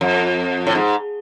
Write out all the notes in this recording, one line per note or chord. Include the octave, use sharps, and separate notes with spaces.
F2
A2
G#2